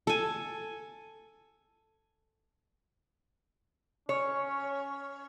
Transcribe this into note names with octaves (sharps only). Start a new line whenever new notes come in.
A4 G#5
C#4 C#5